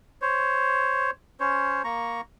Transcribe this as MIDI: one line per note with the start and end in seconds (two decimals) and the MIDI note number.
0.22 1.11 72
0.22 1.11 73
1.40 1.82 61
1.40 1.82 72
1.40 1.82 73
1.84 2.21 58
1.84 2.21 82
1.84 2.21 85